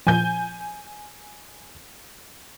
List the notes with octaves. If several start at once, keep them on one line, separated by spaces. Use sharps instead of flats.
A#2 F3 G#5 G6